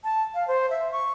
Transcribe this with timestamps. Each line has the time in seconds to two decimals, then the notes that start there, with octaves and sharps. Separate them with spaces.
0.04 A5
0.34 F5
0.48 C5
0.70 E5
0.92 C#6